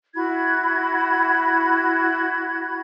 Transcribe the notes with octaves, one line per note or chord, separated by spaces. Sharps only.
E4 F#4 B5 G#6